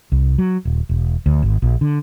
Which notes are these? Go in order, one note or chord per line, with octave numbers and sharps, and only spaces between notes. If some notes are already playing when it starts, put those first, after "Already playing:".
C2
F#3
D#1
E1
D2
G#1
A#1
D3